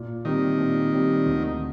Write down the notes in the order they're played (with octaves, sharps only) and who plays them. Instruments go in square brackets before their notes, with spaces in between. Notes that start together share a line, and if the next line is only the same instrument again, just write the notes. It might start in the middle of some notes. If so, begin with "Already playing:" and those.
Already playing: [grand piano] A#2
[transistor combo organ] D#3 [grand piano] G3 C4
[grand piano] A#2
G3 C4
D2